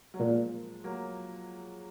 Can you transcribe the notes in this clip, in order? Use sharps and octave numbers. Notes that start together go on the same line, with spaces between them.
F#3
A#2 F3 G#3
F#3 A#3